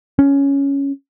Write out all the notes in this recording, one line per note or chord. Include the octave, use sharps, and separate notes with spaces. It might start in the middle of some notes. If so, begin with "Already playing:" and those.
C#4